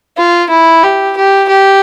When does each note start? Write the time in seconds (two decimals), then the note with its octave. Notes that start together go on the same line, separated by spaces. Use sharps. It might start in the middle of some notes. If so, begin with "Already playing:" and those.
0.17 F4
0.50 E4
0.83 G4
1.17 G4
1.49 G4